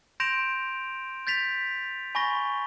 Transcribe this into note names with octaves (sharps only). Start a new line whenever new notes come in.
C6 G6 A#6 D7 E7 F7
G6 A6 B6 F7
G#5 B5 C#6 A6 A#6 G7